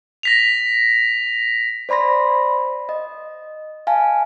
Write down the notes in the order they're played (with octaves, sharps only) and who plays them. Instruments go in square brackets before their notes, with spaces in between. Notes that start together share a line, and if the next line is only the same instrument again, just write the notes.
[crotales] A#6 B6 F7
[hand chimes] C5 D5 B5 C6 A#6
D#5
F5 G#5 A5